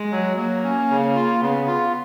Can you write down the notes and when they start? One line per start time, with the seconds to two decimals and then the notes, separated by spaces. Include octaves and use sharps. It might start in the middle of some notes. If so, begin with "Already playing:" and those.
Already playing: G#3
0.12 F#3
0.37 F#3 A#3
0.63 C#4
0.90 C#3
1.15 F4
1.42 C#3 B3
1.67 F4